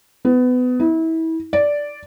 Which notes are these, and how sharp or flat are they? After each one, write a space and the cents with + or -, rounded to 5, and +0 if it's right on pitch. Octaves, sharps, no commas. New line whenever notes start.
B3 +25
E4 -30
D5 -5